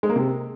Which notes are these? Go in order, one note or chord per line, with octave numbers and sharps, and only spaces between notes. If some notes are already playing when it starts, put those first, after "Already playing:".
G#3
A#3
C3